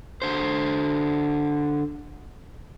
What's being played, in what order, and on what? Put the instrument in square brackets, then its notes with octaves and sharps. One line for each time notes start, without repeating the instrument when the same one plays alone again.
[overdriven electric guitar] D3 C5